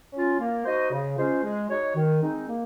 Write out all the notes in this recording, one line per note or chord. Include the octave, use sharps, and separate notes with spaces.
C#4 F4
A#3
D#4 F#4 C5 D#5
C#3
G#3 C#4 F4 C5
G#3
D#4 F#4 C#5
D#3
G#3 C4 D#4
A#3